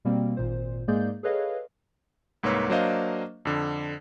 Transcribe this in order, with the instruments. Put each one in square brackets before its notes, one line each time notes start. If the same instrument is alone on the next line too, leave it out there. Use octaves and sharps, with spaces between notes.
[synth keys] B2 G3 A#3 C4
G#1 A#2 C5
G#2 G#3 A#3 G#4 D5 G6
G#4 A4 B4 C#5 D#5 F5
[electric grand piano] C2 G#2 A#3 B4 C#5 E6
F#3 A#3 D4 C5 D#5 F5
F2 D3